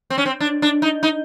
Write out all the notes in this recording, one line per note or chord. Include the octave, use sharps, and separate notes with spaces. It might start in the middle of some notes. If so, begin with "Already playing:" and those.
C4
C#4
C4
D4
D4
D#4
D#4